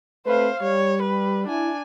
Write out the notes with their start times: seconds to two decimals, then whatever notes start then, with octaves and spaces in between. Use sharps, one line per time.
0.27 A3 C4 B4 C5 F5
0.62 G3 C#5
1.02 B4
1.47 D4 E4 G#5